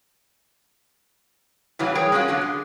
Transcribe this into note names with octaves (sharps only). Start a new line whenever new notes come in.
A2 C#3 E3 F#3 F4
G3 G#4 A#4 C#5 G5
G#3 A3 C#4 D#4 F4 F#4
B2 D3 F#3 A#3
G#3